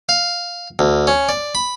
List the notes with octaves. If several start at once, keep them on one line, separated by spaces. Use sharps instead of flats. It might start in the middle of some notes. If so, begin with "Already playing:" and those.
F5
D2
C#4
D5
B5